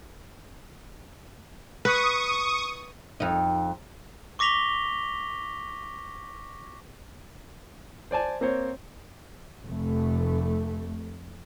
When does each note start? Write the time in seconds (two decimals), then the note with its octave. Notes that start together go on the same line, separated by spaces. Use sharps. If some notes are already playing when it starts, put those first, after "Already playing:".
1.85 B4 C#6 D#6
3.20 F2 D#4
4.39 C#6 D6 A#6 B6 F7 G7
8.11 C5 D5 G#5 A5
8.41 A#3 C4 C5 C#5
9.64 F1 A3